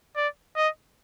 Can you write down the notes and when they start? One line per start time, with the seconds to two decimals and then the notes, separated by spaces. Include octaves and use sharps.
0.16 D5
0.56 D#5